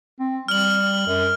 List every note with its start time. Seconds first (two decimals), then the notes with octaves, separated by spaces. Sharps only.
0.20 C4
0.48 G3 F6 F#7
1.07 F#2